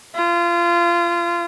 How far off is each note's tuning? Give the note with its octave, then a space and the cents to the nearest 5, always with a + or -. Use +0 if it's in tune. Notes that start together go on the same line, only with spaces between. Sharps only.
F4 -25